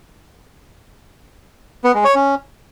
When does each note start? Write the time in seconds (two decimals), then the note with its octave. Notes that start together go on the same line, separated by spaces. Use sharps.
1.84 B3
1.94 G#3
2.05 C#5
2.15 C#4